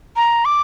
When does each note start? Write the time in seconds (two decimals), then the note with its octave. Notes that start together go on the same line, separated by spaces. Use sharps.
0.16 A#5
0.45 D6